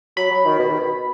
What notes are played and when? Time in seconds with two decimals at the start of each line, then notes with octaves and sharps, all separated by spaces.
0.17 F#3 B5
0.31 F#3
0.45 D#3
0.59 B2
0.70 D#3
0.80 B2